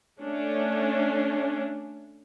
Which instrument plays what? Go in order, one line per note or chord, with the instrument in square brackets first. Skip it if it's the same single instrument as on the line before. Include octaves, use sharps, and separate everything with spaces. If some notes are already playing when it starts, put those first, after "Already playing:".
[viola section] A3 C#4 D4